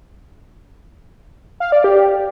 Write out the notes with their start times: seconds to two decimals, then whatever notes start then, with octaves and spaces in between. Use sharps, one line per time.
1.60 F5
1.72 D5
1.84 G4